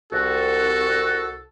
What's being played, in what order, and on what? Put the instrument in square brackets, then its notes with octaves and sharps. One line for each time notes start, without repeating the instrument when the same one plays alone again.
[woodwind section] C2 F#4 [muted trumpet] A4